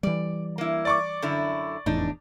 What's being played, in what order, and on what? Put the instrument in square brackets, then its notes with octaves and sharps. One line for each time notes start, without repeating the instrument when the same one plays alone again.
[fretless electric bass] E3 G3 [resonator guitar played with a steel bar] D5
[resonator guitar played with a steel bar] A#3 E4
[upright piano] D5 C#6 D6
[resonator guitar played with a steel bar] F#2 D3 E4
[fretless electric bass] F1 E2 A2 [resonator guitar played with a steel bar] D4 D#4